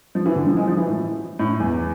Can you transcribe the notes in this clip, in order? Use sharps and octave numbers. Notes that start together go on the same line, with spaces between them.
F3
E3
D3
F3
G#3
F3
E3
A2
A2
E2